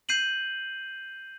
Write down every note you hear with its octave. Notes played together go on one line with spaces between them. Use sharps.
G6 C7 D#7 F#7